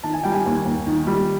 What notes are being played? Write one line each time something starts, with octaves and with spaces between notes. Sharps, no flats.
D#3 A5
G#5
G3 G5
G#5
D#2
D#2
D#3
G3